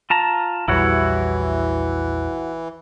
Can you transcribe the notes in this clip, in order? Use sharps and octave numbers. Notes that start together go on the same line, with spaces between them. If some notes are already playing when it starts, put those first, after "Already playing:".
F4 A5 A#5
A#1 E2 E3 G3 E4 F#4 C#5